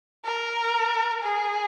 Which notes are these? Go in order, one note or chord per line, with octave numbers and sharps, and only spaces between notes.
A#4
G#4